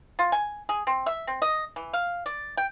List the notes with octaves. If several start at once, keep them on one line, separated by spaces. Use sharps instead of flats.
F4
G#5
G#4
C4
E5
C4
D#5
E3
F5
D5
G5